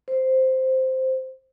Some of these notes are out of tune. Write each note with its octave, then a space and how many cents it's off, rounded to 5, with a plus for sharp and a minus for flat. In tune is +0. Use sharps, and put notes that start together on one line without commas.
C5 -5